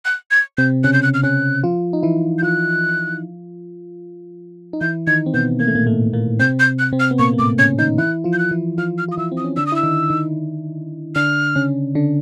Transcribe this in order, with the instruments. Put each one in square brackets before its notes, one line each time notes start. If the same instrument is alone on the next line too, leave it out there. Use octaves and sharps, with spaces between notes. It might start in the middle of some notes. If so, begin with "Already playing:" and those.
[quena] F#6
G#6
[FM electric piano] C3 C4 [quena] G6
[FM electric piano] C#3 C#4 [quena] F#6
[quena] G6
F#6
F6
[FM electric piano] C#3 C#4 [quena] F#6
[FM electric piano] F3 F4
D#4
E3 E4
[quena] G6
[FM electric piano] F3 F4 [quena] F#6
[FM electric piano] D#4
[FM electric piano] E3 E4 [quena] G6
[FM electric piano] D#3 D#4 [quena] G#6
[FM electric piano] C4
[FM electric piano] B2 B3 [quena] G6
[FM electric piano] A#3 [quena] G#6
[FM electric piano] A3
A#2 A#3
A2 A3
A#2 A#3
[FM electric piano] C3 C4 [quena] G6
[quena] G6
F#6
[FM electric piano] C3 C4
[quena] F6
[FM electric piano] B3
[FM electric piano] A#2 A#3 [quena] C#6
[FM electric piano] A#3
[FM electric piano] A2 A3 [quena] D6
[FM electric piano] C#3 C#4 [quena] G#6
[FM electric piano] D#3 D#4 [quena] G6
[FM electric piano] E3 E4 [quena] F#6
[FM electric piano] F3 F4
[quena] G6
F#6
[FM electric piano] E3 E4
[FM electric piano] F3 F4 [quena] F6
[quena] F6
[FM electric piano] F4 [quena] D#6
[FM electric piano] E3 E4 [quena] E6
[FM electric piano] C4
[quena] D#6
[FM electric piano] C#4
[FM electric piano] D3 D4 [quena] E6
[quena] D#6
[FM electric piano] E4 [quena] E6
[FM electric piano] D#3 D#4
D#3 D#4
[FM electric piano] D3 D4 [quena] F6
[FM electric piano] C#3 C#4
D3 D4